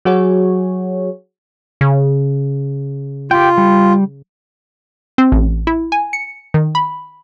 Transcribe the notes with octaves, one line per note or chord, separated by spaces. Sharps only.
F#3 F#4 G#4 C#5
C#3
F4 G4 G5
G3
C4
A1
E4
G#5
C#7
D#3
B5